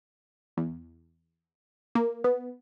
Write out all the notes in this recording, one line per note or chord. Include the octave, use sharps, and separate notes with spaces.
E2
A#3
B3